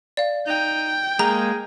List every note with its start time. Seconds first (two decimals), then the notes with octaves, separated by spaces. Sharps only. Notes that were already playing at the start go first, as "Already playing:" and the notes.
0.17 D5 F5
0.47 D#4 G5
1.19 G#3 A#3 G#4 A#5